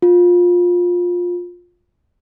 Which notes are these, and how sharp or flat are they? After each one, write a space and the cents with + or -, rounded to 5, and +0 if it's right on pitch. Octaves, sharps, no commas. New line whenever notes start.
F4 +20